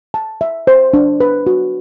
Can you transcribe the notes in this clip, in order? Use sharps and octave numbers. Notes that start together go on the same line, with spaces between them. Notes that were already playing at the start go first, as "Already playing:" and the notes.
A5
E5
C5
D4
B4
F#4